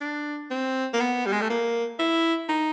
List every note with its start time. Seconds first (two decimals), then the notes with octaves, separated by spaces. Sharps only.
0.01 D4
0.51 C4
0.93 A#3
1.00 B3
1.26 G3
1.33 G#3
1.42 A3
1.50 A#3
1.99 E4
2.49 D#4